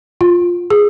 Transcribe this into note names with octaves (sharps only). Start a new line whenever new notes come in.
F4
G#4